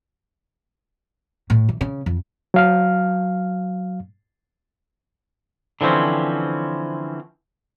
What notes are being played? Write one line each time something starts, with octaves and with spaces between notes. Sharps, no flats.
A2
E3
C#3
F2
F#3 F5 F6
D3 E3 F3 C4 C#4